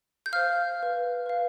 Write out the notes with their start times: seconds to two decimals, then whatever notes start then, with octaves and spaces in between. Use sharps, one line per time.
0.26 G6
0.33 C5 F5 F6
0.80 B4 F5
1.26 B4 F5